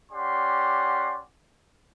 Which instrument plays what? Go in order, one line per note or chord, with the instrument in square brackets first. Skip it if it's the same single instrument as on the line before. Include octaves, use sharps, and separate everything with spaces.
[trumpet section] C#4 G4 D5 F#5 C6